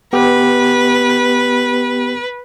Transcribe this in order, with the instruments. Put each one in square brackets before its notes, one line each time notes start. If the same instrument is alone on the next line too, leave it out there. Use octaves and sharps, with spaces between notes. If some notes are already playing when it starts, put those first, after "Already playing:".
[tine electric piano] B3 G4 [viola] B4